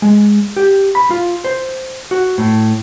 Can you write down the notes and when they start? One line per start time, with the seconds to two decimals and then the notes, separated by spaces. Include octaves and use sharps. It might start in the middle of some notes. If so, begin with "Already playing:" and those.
0.02 G#3
0.56 G4
0.95 B5
1.10 F4
1.45 C5
2.11 F#4
2.38 A2